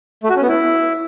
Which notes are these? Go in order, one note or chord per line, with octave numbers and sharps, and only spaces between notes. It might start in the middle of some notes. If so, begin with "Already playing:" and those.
A3
F#4
C#4
B3
E4